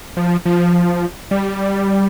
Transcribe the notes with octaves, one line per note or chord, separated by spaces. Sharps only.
F3
F3
G3